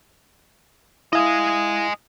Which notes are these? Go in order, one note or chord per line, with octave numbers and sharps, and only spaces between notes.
E4 D#5 F5 G#5 D#6